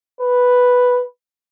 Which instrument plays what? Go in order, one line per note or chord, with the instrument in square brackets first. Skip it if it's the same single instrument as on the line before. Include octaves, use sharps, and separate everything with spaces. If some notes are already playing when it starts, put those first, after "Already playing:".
[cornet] B4